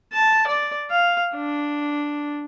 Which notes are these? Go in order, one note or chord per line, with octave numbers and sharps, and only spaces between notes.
A5
D5
F5
D4